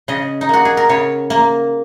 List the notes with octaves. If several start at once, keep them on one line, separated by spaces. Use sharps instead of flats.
C#3 D#5
D#4
A#3 F#4
G#4
A#4
C#3 C#5
A#3